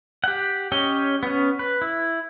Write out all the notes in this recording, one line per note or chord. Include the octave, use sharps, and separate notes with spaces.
G4 F#5
C#4 G4 C#5 D#5 G5
B3 C#4
B4
E4